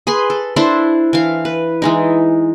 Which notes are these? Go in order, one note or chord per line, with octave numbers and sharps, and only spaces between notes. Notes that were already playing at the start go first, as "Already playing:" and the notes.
G#4 B4 B5 C6
A4
D4 E4 A4 C5
E3 F5
B4
E3 G#3 D#4